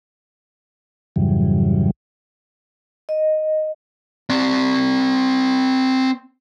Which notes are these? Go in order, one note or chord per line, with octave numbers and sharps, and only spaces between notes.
F2 G#2 C#3 E3 F#3 G3
D#5
C4 D5